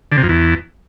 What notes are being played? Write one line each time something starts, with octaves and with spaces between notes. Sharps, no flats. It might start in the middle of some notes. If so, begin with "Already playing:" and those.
D3
C3
F2
E2